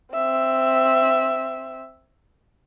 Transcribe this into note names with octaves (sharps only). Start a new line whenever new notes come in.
C4 E5